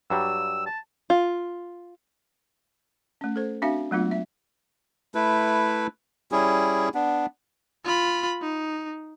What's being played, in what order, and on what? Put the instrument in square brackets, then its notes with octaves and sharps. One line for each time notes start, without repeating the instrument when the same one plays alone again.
[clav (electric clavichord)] G2 F#3 G3 [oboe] E6
[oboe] A5
[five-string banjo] F4
[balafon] A3 C#4
A4 C5
C4 D4 F#4 E5 F5
F#3 G#3 A3 B3 D4 F4
E5
[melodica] A3 E4 B4
G3 C#4 E4 G#4
B3 D4
[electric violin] F4 B5
D#4